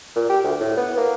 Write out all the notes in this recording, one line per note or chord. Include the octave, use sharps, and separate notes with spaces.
A#2
G4
D2
A2
B3
A#3